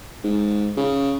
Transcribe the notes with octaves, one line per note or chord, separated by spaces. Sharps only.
G#2
C#3